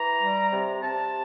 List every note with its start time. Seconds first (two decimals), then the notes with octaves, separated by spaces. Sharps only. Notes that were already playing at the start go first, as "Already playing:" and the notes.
Already playing: E3 A#5
0.22 G3
0.53 C3
0.82 C3 A5